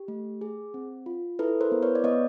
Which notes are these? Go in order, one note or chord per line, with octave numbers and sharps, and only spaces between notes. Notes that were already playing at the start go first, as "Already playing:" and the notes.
Already playing: G4
A3
G#4
C4
F4
E4 A4 B4
A#4 C5
B3
B4 C#5
D5
B3 C#5 D#5